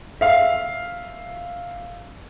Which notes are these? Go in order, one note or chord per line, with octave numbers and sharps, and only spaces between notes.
E5 F5